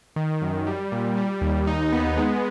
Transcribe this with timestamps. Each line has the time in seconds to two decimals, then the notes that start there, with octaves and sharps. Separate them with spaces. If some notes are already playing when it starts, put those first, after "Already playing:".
0.16 D#3
0.42 F#2
0.67 G3
0.92 A#2
1.17 G3
1.41 D#2
1.67 D#4
1.92 B3
2.17 G#3